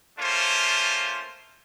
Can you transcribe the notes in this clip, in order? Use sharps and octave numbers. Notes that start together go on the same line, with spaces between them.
A3 A#3 C#4 F4 C5